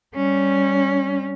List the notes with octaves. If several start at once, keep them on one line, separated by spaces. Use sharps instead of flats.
G3 C#4